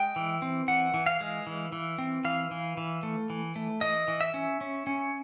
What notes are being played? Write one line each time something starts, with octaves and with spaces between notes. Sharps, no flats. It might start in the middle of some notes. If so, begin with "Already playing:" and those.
Already playing: G#3 G5
E3
C4
E3 F#5
E3
F5
G#3
E3
E3
C4
E3 F5
E3
E3
A3
E3
A3
E3 D#5
E3
E5
C#4
C#4
C#4